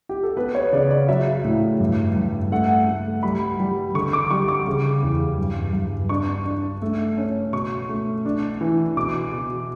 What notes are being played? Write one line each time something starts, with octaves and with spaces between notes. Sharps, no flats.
G4
A4
B3 B4
C#5
C#3 D5
D5
F#3 E5
A2
G2
G2
A3 F#5
A3
G3 B5
G3
D3 C#6
D6
G3 C#6
D6
C#3
E2
G2
G2
D4 C#6
D4
A3
C#4
B2 C#6
A3
D4
E3
B2 D6
B2